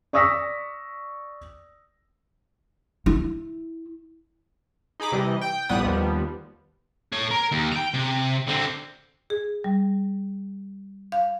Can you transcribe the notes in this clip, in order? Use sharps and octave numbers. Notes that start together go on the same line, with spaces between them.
D5 C#6 D#6 E6 A#6 B6
E4
D#4 G#4 B5 D6
C3 E3 G3 D#5
G5
A#1 A2 G3 B3 B4 D#6
D#2 F3 G3 B3
A3 C#5
A#4
D#2
G5 A#5
C3
D3 C4
G#4
G3
F5